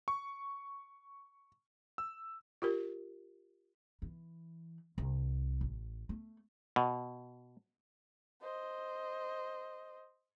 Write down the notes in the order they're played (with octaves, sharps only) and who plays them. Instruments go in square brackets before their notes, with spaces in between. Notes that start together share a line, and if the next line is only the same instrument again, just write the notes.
[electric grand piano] C#6
E6
[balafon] F4 G4 A#4
[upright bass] E3
C2
A1
A3
[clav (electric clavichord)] B2
[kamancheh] C5 D#5